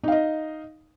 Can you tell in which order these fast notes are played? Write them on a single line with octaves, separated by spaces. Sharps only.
D#4 F5 D#5